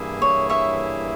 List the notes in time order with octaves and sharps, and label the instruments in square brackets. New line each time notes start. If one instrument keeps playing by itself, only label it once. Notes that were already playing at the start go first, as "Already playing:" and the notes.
Already playing: [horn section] G2 E3 A#3 E4 G#4
[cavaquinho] C#5
C#5 E5